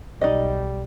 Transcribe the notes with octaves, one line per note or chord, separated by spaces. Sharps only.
B1 G3 D#4 D5 D#5